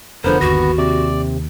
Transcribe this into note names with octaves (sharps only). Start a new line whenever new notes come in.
F1 D3 F3 B3 A#4 C5
G1 D#2 F#4 A#6
C3 D5